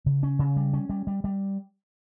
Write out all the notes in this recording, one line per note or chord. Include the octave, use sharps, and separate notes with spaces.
C#3
C#4
C#3
G3
C#4
G3
G3
G3